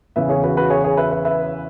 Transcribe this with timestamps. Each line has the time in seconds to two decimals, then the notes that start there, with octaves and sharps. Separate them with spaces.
0.16 E2 C#3 E3 B4 E5
0.29 G#4 C#5
0.43 F#4 B4
0.57 F#4 B4
0.70 G#4 C#5
0.84 G#4 C#5
0.97 B4 E5
1.11 B4 E5
1.25 B4 E5